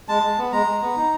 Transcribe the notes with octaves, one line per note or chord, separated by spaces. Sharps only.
G#3 A5
G#3
B3
G#3 A#5
G#3
B3
D#4